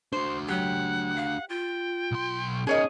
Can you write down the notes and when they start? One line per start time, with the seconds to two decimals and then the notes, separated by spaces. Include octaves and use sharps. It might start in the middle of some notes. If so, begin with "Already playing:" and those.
0.12 D4 F#4 C5
0.49 F#3 G4 F#5
1.16 F5
1.49 F4 G5
2.11 B1 C6
2.67 C#4 D#4 G#4 A#4 C#5 D#5